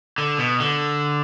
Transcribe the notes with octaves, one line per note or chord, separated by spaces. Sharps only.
D3
B2
D3